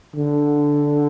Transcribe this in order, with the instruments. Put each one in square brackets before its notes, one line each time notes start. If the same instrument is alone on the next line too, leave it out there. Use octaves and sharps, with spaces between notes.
[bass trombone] D3